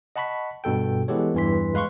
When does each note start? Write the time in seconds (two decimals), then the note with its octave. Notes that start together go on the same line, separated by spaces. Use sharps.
0.16 D#5 F#5 A5 B5 C#6 B6
0.64 G2 B2 A4 G5
1.08 E3 G#3 B3 G4 A4 C#5
1.34 E2 G2 E3 C6 B6
1.74 G#3 B4 F5 C6 C#6